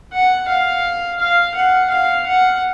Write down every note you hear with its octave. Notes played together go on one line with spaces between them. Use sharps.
F#5
F5
F5
F#5
F5
F#5